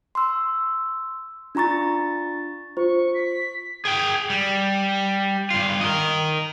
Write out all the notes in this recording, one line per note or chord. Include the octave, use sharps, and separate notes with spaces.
C6 E6
D4 F4 A#5 C#6 A6
F4 C5 C#6
B6
G#4 G5
G3
G2 F4
A#4 D#5